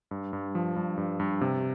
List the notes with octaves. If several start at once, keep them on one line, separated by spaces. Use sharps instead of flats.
G2
G2
F3
G2
G2
G2
C3